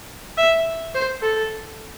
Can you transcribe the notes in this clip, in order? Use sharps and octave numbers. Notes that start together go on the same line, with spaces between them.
E5
C5
A4